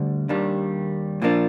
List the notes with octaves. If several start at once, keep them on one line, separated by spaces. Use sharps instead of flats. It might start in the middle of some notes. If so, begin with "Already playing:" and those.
Already playing: D2 D3 G3 D4
D#2 D#3 G3 D4
A#2 F3 A#3 D4